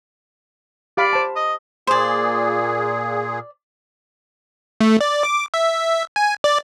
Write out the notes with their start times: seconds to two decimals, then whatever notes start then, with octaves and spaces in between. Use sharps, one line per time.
0.97 G4 D5 F5 B5
1.13 C5 A5
1.36 D#5
1.87 A#2 G#4 C5 D5
4.81 A3
5.01 D5
5.23 D6
5.54 E5
6.16 G#5
6.44 D5